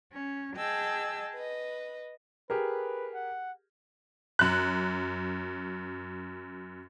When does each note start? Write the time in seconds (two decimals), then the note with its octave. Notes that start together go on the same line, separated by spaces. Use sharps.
0.11 C#4
0.55 G#4 D#5 G5 A5 E6
1.34 B4 D#5
2.50 G4 G#4 A#4 B4
3.14 F#5
4.39 F#2 F#6